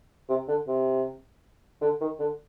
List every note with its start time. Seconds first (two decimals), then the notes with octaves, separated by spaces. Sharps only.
0.29 C3
0.48 D3
0.67 C3
1.81 D3
2.01 D#3
2.19 D3